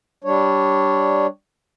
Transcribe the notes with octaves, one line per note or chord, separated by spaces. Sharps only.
G3 D4 C#5